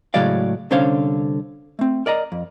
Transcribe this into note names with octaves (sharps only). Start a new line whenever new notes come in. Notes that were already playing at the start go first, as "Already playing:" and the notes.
A2 C#3 F#3 G#3 D5 F5
C2 D3 C#4 C5 C#5 F5
A3 C4
A#4 D5 D#5 A#5
F2